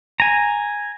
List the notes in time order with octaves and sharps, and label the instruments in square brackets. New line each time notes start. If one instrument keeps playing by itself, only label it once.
[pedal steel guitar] G#5 A#5